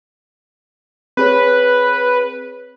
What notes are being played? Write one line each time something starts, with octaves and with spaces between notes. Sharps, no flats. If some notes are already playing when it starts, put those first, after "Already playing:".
C4 G#4 B4 C#5